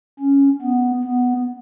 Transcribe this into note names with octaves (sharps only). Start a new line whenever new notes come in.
C#4
B3
B3